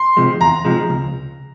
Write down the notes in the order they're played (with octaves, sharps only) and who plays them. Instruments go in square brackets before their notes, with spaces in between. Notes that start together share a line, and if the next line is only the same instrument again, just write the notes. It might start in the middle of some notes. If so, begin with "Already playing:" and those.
Already playing: [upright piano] C6
[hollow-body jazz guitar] C3 F3 G#3
[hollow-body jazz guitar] E2 [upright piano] A#5
[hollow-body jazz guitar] C3 F3 G#3
C#2